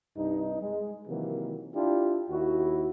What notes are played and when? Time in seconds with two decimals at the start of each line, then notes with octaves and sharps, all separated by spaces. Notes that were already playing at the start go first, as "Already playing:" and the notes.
0.16 C2 G2 D#4
0.61 G#3
1.08 C3 D#3 E3 F#3 A#3
1.74 D4 E4 F4 G4
2.30 D#2 E4 F#4